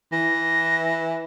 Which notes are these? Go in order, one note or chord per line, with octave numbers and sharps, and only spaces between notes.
E3 A#6